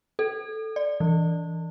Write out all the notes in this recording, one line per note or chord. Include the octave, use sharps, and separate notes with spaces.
A4
D5
E3